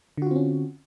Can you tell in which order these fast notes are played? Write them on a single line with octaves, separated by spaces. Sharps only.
D3 F#4 F4 C4 C#4